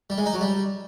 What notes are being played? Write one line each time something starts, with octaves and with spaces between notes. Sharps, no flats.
G3
G#3
D#4
F#3
G3